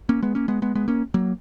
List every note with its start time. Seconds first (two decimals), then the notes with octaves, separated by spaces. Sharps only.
0.09 A#3 C#4
0.22 G#3 B3
0.35 A#3 C#4
0.48 G#3 B3
0.62 G#3 B3
0.75 G#3 B3
0.88 A#3 C#4
1.14 F#3 A#3